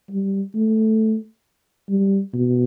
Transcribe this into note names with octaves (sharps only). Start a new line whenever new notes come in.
G3
A3
G3
B2